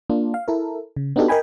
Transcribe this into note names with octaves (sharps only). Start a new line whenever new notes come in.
A#3 D4 F4
F5
E4 A4 A#4
C#3
B3 D4 D#4 F#4 G4 A4
A#4 D#5 G5 G#5 B5